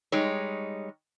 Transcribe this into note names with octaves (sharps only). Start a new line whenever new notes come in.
G3 G#3 D#4 C#5